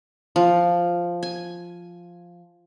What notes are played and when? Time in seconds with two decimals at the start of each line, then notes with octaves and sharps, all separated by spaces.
0.36 F3
1.23 G#5